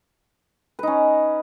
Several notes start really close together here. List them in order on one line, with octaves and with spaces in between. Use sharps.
B4 D#4 C#4